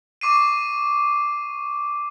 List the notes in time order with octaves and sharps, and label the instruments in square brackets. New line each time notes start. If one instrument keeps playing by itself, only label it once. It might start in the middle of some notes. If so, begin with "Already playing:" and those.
[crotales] C#6 D6 C7 D#7